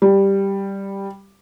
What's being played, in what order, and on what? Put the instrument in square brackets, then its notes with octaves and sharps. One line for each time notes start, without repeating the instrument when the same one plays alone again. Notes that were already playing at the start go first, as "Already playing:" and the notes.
[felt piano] G3